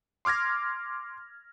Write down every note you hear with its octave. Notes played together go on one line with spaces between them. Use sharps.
C6 D6 F6 G#6 A#6